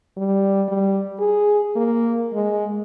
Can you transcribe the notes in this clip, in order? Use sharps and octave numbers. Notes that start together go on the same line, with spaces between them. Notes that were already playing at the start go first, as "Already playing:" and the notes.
G3
G3
G#4
A#3
G#3